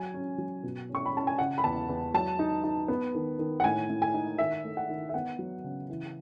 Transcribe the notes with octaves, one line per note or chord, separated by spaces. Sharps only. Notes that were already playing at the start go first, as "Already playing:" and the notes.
Already playing: F#3 G#5
C#4
F#3
B2
C#4
C#6
B5
C#4 A5
G#5
C#3 F#5
B5
E2 A5
E2
F#3 A5
D#4
D#4
B3
D#3
D#3
F#5
A2 G#5
A2
G#5
D#4
D#3 E5
A3
F#5
D#3
E5
B3 F#5
F#3
C#3
E3